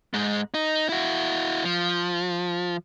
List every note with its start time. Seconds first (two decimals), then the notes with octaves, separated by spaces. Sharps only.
0.14 G#2 G#3
0.54 D#4
0.89 E4 F#4
1.65 F3